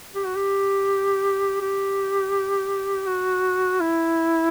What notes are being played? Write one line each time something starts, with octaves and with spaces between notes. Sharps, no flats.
G4
F#4
G4
G4
F#4
E4